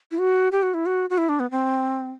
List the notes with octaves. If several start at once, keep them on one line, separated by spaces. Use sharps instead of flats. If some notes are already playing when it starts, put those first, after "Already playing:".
E4
F#4
G4
F#4
E4
F#4
F#4
E4
D4
B3
C4